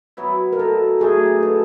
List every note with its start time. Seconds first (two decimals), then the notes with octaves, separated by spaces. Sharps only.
0.17 F#3 B3 E4
0.53 A#4
0.59 B2 A4
1.00 F#3 A3 D4 G#4
1.43 B2 A4